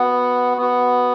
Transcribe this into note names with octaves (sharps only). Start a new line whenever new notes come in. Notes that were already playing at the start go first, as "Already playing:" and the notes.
Already playing: B3 F#4
B3 F#4